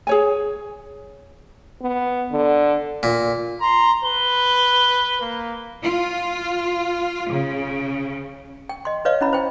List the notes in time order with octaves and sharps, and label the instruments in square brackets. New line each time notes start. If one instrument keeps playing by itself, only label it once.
[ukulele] G#4 C#5 G#5
[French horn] B3
D3
[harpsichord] A#2
[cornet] A#5 [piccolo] C6
[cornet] B4 [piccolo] G7
[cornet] A#3
[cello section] F4
C#3
[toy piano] G5
D#5 C6
B4 C#5 D#5 F5
C#4 E4 B5
C5 G5